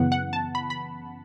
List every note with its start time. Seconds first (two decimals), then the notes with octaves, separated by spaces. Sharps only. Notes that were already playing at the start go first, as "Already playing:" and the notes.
Already playing: F#2 C#3 E3 B3 F#5
0.12 F#5
0.33 A5
0.55 B5
0.70 B5